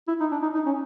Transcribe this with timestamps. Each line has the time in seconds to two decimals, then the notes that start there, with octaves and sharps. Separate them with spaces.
0.08 E4
0.20 D#4
0.32 D4
0.43 D#4
0.55 D#4
0.66 C#4